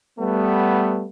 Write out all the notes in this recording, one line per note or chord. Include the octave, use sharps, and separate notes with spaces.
G3 A3 B3